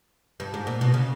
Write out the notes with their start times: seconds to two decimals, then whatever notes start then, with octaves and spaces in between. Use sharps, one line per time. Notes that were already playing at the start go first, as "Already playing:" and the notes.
0.40 G2
0.54 G#2
0.67 A#2
0.81 B2
0.94 C#3